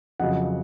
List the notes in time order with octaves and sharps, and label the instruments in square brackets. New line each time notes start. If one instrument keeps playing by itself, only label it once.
[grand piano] F2 C#3 F#3 D#5 F#5